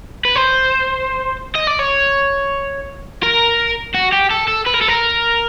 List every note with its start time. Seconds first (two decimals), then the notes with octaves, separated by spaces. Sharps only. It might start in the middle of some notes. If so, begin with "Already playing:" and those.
0.25 B4
0.36 C5
1.55 D#5
1.67 D5
1.79 C#5
3.23 A#4
3.94 F#4
4.12 G4
4.31 A4
4.48 A4
4.66 B4
4.74 A#4
4.81 A4
4.88 A#4